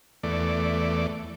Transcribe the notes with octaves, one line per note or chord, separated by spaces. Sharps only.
E2 A3 D5